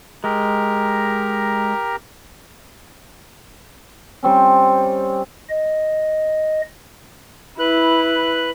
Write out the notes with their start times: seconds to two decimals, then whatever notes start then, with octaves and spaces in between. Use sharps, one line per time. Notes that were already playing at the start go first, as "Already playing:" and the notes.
0.24 G#3 G4 A#4 A#5
4.23 G3 C4 C#4
5.49 D#5
7.59 E4 B4 F#6